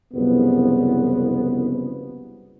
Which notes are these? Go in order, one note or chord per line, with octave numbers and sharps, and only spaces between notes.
F#1 C2 C#3 F3 B3